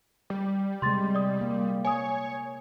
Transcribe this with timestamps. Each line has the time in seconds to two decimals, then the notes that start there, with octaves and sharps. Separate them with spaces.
0.30 G3
0.82 C3 G#3 C6 A6
1.14 D5 D#6
1.41 A#3
1.85 C#5 G#5 D#6